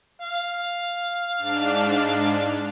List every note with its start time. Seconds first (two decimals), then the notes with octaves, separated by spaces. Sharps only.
0.22 F5
1.38 G#2 D4